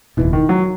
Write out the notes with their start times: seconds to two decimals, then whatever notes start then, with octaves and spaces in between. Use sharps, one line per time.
0.17 F#1 E2 B2 E3
0.33 D#3
0.49 F#3